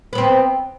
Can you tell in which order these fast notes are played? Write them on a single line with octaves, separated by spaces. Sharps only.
B4 B3 C4